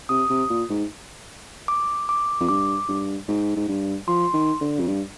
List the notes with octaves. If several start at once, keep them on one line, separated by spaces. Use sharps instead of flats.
C3 D#6
C3
A#2
G#2
D6
D6
F2
G2 D6
G2
G#2
G#2
G2
F3 C6
D#3
D3
F2
G2